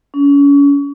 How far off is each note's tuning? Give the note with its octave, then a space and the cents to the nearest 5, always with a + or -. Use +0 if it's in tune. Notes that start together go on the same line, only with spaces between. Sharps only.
C#4 +35